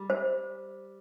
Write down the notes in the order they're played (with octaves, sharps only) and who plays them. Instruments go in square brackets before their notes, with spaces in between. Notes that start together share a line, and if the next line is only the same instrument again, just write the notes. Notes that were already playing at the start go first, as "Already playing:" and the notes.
Already playing: [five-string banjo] G3
[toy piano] C5